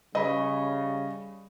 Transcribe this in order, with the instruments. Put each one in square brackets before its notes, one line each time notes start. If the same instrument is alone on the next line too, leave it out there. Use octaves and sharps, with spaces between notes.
[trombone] C#3 [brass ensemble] G3 [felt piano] D#5 B5